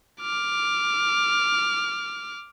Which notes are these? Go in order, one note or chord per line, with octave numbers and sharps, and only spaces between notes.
D6 F6